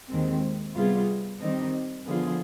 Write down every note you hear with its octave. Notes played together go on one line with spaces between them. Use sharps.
D#2 D#3 G#3 C4
C3 G3 B3 F4 G#4
D#3 G3 C4 D#4
D3 F3 B3 F4 G#4